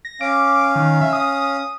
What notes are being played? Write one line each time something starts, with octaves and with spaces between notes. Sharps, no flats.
A#6
C#4 F5 D6
D#3
E5
D#6